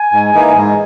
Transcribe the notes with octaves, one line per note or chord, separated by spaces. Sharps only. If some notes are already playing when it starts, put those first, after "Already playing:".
Already playing: G#5
G#2
E3 A#3 D#4
G#2